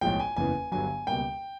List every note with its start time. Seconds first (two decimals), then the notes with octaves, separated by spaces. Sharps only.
0.01 B1 A2 F3 G#3 G5
0.20 G#5
0.37 F#1 E2 C#3 E3 G#5
0.72 G1 G2 D3 F#3 G#5
1.07 C#2 B2 G3 A#3 G5